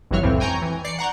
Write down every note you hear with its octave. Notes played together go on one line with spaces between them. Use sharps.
G#1 G2 E3 F#3 C#5 F6
C2 F2 A2 E3 C4
G5 G#5 A#5 C#6 G6
E3
D5 C7 C#7
F#5 A#5 C#6 G6